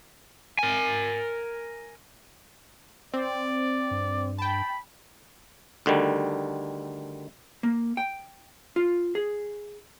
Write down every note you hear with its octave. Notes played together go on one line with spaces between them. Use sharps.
A#4 G#5
C4 D5
G2
G5 A5 B5
D2 D3 D#3 G3
A#3
G5
F4
G#4